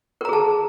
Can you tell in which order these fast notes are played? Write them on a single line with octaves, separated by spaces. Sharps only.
A#4 A#5 G#4 A5